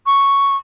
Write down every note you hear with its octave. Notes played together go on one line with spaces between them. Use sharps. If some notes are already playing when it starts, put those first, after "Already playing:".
C#6